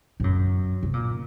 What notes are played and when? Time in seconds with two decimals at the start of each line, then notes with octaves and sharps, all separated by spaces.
0.20 G#2
0.24 F#2
0.83 C3
0.94 A#2